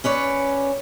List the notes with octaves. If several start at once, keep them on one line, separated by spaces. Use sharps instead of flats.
C#4 B4 C#5 D5